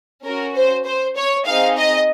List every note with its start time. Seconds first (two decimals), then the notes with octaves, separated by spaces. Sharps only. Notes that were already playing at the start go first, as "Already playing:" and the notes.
0.24 C#4 F#4 A#4
0.55 C5
0.85 C5
1.16 C#5
1.45 C4 D#4 G#4 F5
1.77 D#5